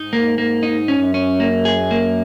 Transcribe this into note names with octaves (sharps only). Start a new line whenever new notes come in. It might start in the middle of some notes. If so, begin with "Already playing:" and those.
Already playing: G#2 D#4
A#3
A#3
D#4
F#2 C#4
C#4
A#3
G#4
A#3